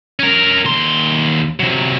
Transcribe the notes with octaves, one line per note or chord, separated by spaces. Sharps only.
C#4 A#4
D#2 C6
C3 F#3